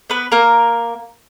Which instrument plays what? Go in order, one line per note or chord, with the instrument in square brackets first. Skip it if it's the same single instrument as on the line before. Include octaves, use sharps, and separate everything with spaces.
[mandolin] B3 B4
A#3 A#4